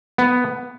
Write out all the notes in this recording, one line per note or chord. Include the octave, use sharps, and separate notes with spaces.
B3